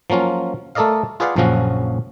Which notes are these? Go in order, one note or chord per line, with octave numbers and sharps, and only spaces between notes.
F3 F#3 A#3 C#4 F4
A3 A4 A#4 D5 D#5 F5
F4 G#4 B4 D5 F5 F#5
A#1 F#2 C#3 F3 C#4 F#4